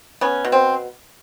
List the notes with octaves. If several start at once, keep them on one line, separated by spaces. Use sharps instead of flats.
B3 C#4
B2
C4